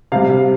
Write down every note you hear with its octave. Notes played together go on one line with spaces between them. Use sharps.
C3 G3 F5